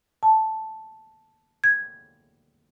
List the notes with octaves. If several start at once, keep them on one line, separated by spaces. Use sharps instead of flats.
A5
G#6